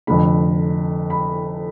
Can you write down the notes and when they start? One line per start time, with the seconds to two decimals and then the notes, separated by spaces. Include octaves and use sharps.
0.07 F1 F2 D3 B5
1.10 B5